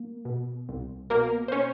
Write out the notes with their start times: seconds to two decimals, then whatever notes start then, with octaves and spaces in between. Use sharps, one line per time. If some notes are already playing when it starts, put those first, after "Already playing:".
Already playing: A#3
0.25 B2
0.69 C2
1.10 B2 A#3 A#4
1.48 C5
1.52 C#4 C#5